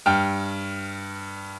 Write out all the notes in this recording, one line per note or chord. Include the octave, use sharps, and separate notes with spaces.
G2 G5 F6